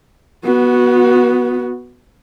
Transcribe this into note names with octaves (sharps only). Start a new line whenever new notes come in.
B3 F#4